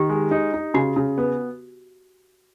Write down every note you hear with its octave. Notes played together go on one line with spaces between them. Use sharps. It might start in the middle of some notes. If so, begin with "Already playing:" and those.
Already playing: D#3 G4
G#3
D#4
D#4
C#3 F#4
C#3
B3